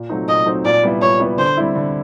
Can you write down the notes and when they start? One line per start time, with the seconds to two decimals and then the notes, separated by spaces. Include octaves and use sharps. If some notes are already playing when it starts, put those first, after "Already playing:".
Already playing: A#2
0.10 F#3 A3 C4 D#4
0.28 A#2 D#5
0.46 F#3 A3 C4 D#4
0.65 A#2 D5
0.83 G3 B3 E4
1.01 A#2 C#5
1.20 G3 B3 E4
1.38 D3 C5
1.57 G3 C4 E4
1.75 D3